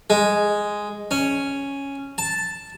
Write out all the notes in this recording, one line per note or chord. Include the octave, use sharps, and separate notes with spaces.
G#3
C#4
A5